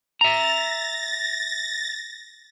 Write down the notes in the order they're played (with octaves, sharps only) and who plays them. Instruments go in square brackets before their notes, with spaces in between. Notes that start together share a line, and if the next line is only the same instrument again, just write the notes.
[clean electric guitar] E5 A#5 [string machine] A6 A#6